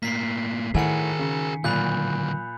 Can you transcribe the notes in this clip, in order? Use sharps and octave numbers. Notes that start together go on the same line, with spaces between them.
A2 A#3 B6 C7
A2 D#3 G#4 A#4 F#5 G#5 C#7
C#3
A#2 D3 F#3 B5 F#6 G6